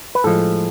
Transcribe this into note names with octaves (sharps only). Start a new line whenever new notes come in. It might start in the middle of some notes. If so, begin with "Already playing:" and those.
B4
A2 F3 G#3 A4